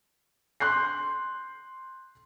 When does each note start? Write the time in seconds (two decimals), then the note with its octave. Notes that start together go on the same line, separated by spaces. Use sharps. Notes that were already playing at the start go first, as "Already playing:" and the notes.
0.60 C6 F#6 G6 C7